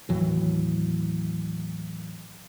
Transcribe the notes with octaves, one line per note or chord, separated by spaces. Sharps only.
D#2 A2 E3 F#3